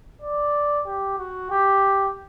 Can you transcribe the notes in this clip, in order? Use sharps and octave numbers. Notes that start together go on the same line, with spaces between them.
D5
G4
F#4
G4